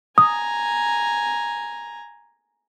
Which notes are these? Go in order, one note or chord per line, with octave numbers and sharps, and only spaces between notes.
G#5 A#5 D#6